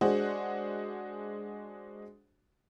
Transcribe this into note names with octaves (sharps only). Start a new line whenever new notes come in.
G#3 D4 F#4 G#4 C5 F#5